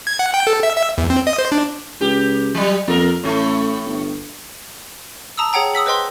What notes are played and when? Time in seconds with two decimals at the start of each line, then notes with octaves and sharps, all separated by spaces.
0.07 G#6
0.19 F#5
0.34 G5
0.47 A4
0.63 E5
0.76 E5
0.98 E2
1.10 C4
1.27 D#5
1.38 C5
1.52 D4
2.01 C#2 G4
2.55 F#3 G3
2.88 F2 A#3 A#4
3.24 A1 A2 A3
3.86 G1
5.37 A5 A#5 D#6 E6
5.53 G#4 C#5 F#5 G5 A#5
5.74 D#6 E6 B6 F#7
5.86 B4 C5 D#5 G5 C6